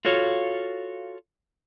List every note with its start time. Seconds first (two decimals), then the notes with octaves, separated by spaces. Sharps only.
0.05 F4 F#4 A4 C#5 F5